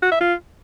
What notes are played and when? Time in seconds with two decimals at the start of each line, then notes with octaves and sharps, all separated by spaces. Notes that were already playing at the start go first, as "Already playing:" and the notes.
0.03 F#4
0.11 E5
0.20 F4